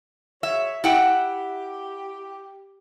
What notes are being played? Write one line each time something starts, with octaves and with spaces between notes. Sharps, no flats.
F#4 G#4 C#5 E5
E4 G4 F#5 G5